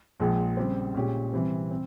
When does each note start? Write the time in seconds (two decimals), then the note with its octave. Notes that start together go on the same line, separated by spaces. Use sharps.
0.20 A#1 A#2 F3 G#3
0.57 C#3 G3 C4 G4 C5
0.95 A#2 G#3 C#4 G4
1.33 C3 E3 G3 C4
1.71 C4